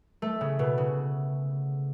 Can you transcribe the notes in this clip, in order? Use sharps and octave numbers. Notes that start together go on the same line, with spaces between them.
A3
C#3
B2
C#3